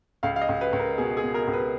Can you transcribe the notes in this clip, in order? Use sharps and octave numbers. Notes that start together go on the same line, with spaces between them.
C#2 F5
F5
D#5
C#2
B4
C#2
A#4
B2 G#4
G#4
B2
A#4
C#2
B4